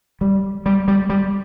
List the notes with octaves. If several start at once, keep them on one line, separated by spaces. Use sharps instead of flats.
G3
G3
G3
G3